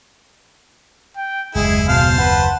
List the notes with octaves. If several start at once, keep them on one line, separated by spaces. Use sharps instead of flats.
G5
F#1 D#2 G#3 E4 G#4
B2 C5 F5 A5 C6
B4 F#5